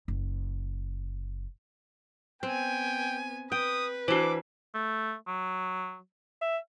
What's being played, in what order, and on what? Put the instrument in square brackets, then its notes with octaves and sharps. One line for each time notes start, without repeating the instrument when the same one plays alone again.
[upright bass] F#1
[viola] B3 G#5 [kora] C4 [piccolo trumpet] G5
[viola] B4 [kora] G5 [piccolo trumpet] D#6
[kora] E3 D4 [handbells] F#4 C5 [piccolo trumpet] D6
[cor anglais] A3
F#3
E5